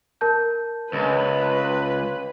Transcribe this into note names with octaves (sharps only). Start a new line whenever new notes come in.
A#4 A5 G6
C#2 B4